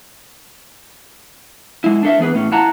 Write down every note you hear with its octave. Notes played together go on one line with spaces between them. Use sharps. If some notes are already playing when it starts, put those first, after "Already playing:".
G#3 E4
D4 A4 E5
E3 B3 G#4 B4
A2 C#4
E4 F#5 A5 A#5